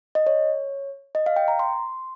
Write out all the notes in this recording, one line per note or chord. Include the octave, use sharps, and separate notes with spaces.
D#5
C#5
D#5
F5
G5
A#5
C6